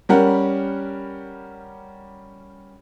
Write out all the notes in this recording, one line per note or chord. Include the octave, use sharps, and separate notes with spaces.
G3 C#4 G4 A#4 F#5